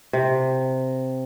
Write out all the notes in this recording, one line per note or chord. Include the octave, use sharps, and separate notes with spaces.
C3